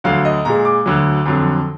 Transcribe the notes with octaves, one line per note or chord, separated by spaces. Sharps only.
D2 D3 F#3 F5
D#5
A#2 G#3 A#5
D6
D2 D3 F#3
F2 D3 F#3